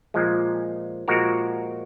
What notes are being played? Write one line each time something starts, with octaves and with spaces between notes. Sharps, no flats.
A#2 F3 G#3
A#2 F3 G#3 F#4 A#4